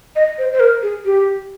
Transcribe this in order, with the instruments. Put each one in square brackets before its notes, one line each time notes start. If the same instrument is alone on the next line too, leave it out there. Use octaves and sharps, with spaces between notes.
[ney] D#5
C5
C5
A#4
G#4
G4